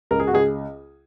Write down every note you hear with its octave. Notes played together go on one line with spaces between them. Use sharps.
C#2 A#4
G#4
F#4
C#2 G#4